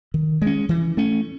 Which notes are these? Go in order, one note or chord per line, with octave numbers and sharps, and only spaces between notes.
D#3
G#3 C#4
E3
A3 C#4